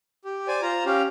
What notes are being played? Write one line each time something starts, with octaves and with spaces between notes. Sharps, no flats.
G4
C5 D5 G#5
F4 C5 A#5
C#4 G4 F5